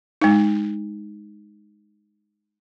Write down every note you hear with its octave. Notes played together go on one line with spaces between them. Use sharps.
G#3 D#4